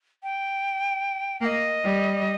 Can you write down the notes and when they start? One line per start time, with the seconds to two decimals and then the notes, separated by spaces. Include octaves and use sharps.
0.23 G5
1.40 A#3 D#5 G5
1.84 G3